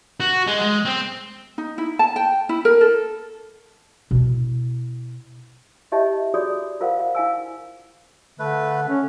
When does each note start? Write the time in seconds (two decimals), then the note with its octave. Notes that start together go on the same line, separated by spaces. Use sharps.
0.20 F#4
0.47 G#3
0.61 G#3
0.85 C4
1.58 D#4
1.78 E4
1.99 A5
2.16 G5
2.49 E4
2.65 A#4
2.81 A4
4.11 B2 E4
5.92 E4 G4 C#5 D#5 E5 A5
6.34 F4 F#4 G#4 C#5 D5 D#6
6.80 F4 A#4 C5 F5 F#5
7.00 F5
7.15 E4 F5 G#5 E6
8.39 D3 A3 B4
8.89 C#4